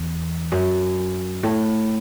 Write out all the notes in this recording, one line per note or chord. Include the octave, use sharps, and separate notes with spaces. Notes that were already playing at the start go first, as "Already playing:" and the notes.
Already playing: E2
F#2
A2